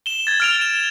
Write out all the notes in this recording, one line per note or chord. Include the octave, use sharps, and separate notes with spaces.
E7 G7
G#6 A6
F6 D7 F7
E7